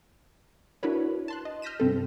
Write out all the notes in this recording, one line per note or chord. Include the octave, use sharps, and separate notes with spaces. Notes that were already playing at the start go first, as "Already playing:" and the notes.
D4 E4 F#4 A#4 B4 C#5
A5 C6 F#6
D#5
F6 G6 A#6 B6 D#7 E7
G2 C3 C4 A4